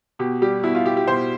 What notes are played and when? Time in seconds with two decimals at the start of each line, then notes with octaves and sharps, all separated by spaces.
0.19 B2 G4
0.42 G3 G4
0.63 B2 E4
0.75 F4
0.85 B2 G4
0.97 G4
1.07 B2 C5